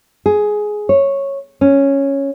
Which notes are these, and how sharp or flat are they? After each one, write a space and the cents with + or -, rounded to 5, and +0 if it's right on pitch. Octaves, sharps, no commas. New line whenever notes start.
G#4 +10
C#5 -10
C#4 -5